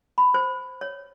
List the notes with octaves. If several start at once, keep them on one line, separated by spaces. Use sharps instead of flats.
B5
C5
C#5